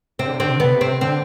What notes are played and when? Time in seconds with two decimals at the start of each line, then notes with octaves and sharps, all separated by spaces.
0.19 C3 C4
0.27 D3
0.35 C3
0.40 D3 C4
0.50 C3
0.57 D3
0.60 B3
0.65 C3
0.81 C4
1.01 D3 C4